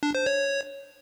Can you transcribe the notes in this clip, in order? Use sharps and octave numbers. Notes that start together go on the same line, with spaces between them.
D4
C5
C#5